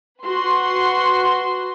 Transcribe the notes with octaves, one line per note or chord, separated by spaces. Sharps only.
F#4 B4 C6